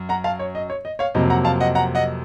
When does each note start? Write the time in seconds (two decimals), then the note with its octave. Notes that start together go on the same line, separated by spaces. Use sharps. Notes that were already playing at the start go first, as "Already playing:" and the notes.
Already playing: F#2
0.09 F#5 A#5
0.24 F5 A5
0.39 C#5
0.55 D#5
0.70 C#5
0.85 D#5
0.99 C#5 F5
1.15 F2 C3 F#3 A#3 D#5
1.30 F#5 A#5
1.45 F5 A5
1.60 D#5 F#5
1.75 F#5 A#5
1.95 D#5 F#5